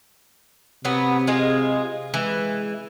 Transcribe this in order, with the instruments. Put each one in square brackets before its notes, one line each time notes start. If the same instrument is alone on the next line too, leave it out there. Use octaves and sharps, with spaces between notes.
[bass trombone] C3 [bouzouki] F#3 B3
[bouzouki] G#3 F4 G#4
[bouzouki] E3 [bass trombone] G#3